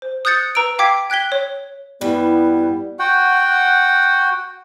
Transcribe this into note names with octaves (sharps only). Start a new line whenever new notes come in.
C5
D#6 F#6 G6 A6 C#7
B4 A#5 E6 D7
F5 G5 D6 E6 G#6 B6
G5 F#6 G#6 B6 G7
C#5
G2 E3 G3 B3
F#4 F#5 G5